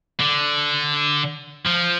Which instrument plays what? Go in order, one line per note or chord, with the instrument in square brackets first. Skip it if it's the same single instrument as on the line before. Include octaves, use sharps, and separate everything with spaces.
[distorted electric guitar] D3
F3